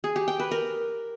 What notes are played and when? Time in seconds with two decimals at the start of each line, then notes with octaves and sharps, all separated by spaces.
0.04 G#4
0.16 G4
0.28 G5
0.40 B4
0.51 A#4